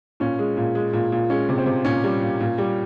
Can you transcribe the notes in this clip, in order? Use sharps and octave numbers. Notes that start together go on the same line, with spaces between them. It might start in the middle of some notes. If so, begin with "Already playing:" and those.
A#2 C#4
G#3
A#2
G#3
A#2
A#2
G#3 C#4
C3
C4
C3
A#2 C#4
G3
A#2
A#2
G3